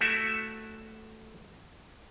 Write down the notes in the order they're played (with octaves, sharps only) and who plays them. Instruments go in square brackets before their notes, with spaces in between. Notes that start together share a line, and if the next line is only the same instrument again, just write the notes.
[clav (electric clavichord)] A3 E4 F#4 E5